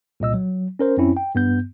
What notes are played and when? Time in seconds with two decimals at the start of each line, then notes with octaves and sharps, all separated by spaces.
0.20 C2 A#2 D#5 E6
0.34 F#3
0.79 C#4 A#4 C5
0.97 F#2 C4 C#4 E4
1.17 G5
1.35 G2 B3 G6